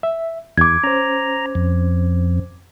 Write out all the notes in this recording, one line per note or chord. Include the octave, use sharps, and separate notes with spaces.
E5
E2 D6 G#6
C#4 C5 A#5
F2